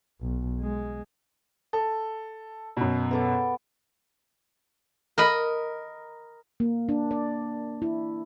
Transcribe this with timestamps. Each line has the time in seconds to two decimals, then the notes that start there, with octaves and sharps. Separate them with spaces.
0.20 B1
0.60 G#3
1.73 A4
2.77 F#2 B2
3.11 B3 A4 D6
5.18 A#4 D#5 B5
6.60 A#3
6.89 D4
7.11 D5
7.82 E4